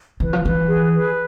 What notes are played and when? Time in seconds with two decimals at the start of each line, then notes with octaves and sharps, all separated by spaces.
0.20 E3 B4
0.33 F3
0.45 E3 B4
0.69 G#4
0.94 B4